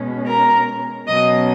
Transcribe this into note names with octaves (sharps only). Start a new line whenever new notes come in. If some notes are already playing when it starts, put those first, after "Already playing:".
Already playing: B2 G#3 C#4
A#4 A#5
B2 F#3 C#4 D#5 D#6